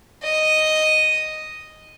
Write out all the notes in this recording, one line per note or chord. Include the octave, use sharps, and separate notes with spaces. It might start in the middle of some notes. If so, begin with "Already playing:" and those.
D#5